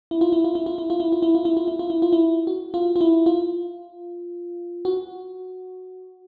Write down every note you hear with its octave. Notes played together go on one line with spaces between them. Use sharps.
E4
F4
E4
F4
E4
F4
E4
F4
E4
F4
E4
F4
E4
F4
E4
F4
E4
F4
E4
F#4
F4
F4
E4
F4
F#4